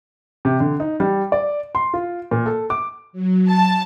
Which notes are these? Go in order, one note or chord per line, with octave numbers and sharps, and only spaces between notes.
C3
D3
D#4
G3
D5
C6
F4
A#2
A4
D6
F#3
A5